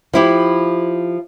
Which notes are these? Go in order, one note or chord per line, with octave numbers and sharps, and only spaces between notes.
F3 E4 G4